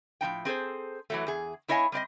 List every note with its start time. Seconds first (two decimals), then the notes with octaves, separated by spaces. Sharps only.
0.21 A2 F3 D#4 G5
0.45 C4 G#4 A4 C5
1.10 E3 F#3 A3
1.27 E2 G#4
1.68 B3 E4 C#5 D#5 F5 G#5
1.92 G3 C4 D5 D#5